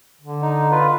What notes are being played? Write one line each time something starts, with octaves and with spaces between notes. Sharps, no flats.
D3
D#4
F4 B4